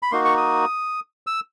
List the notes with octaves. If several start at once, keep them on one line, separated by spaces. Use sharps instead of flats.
B5
A#3 D#4 F#4 C6
C#6
D#6
E6